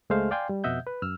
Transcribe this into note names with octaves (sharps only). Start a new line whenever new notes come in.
C#2 G#3 A3 C5 F5 F6
D5 F5 G5 G#5 C6
G3
F2 B2 D#5 E5 F#5 G6
B4
F#2 E6 F6